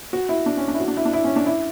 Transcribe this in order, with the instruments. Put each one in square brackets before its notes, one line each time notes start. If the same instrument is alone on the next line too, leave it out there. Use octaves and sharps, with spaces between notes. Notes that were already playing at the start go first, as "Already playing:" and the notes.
[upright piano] F#4
E4
D4
C#4
D4
E4
F#4
D4
E4
D4
E4
C#4
D4
E4